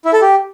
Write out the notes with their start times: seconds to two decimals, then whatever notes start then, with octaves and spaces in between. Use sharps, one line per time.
0.05 E4
0.13 A4
0.21 G4